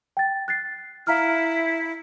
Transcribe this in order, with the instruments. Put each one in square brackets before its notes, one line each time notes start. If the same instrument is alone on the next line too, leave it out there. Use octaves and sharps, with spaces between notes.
[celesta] G5 A6
F#6 A6 C7
[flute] E4 [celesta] F5 A#5 F6